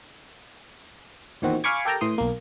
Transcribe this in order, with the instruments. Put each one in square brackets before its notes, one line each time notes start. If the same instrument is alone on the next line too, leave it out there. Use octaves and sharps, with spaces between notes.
[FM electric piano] E2 A#2 D#3 C4 F#4
F5 G#5 B5 C#6 D6 G#6
G4 A4 A#4 G5 A5 A#5
A2 E3 C6 D#6
B1 A#3